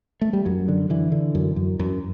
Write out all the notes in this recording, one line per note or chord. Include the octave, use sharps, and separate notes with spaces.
A3
G3
F#2 F#3
D3
D3 E3
D3
F#2
F#2
F#2